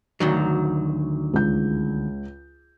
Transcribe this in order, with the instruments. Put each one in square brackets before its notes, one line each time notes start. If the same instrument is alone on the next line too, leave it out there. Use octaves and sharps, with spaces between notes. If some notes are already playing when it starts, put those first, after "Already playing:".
[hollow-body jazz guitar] D2 D#3 F#3
[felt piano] C#2 G6